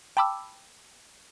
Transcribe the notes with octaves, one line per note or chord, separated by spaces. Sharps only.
G5 A5 B5 D6 E6